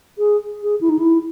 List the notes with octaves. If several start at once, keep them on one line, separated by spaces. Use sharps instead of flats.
G#4
G#4
E4
D#4
E4